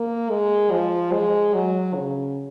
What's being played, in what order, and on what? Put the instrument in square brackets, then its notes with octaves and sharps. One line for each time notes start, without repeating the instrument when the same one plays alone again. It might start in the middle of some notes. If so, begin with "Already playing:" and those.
Already playing: [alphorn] A#3
G#3
F3
G#3
F#3
C#3